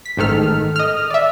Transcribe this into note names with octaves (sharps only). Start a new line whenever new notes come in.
B6
A1 G#2 D#3 A4 F6
D#5 F6
D5 E5